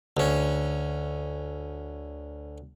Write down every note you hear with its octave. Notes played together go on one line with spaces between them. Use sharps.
D2 C#4